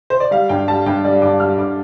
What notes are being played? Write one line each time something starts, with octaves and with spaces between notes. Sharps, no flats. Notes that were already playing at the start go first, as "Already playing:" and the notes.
C5
D5
G3 F5
G2 G5
G3 A5
G2 G5
G3 D5
G2 D6
G3 F6
G2 D6